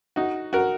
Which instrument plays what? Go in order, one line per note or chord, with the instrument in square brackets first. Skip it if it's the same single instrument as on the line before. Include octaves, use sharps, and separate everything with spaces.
[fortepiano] D#4 F#4
F#4 A#4